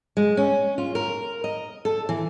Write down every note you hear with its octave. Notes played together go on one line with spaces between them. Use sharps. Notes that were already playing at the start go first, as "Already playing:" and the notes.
G#3
C#4
F4
A#4
D#5
A4
E3